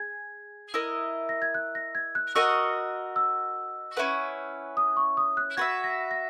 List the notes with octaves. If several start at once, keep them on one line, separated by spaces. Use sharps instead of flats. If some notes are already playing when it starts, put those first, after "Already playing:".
Already playing: G#4 G#5 G#6
E4 A#4 D#5
A#6
G#6
F#6
A#6
G#6
F#6
F#4 A#4 D#5 F#5 E6
E6
C#4 E4 B4 F#5
D#6
C#6
D#6
F#6
F#4 B4 E5 G#6
A#6
A#6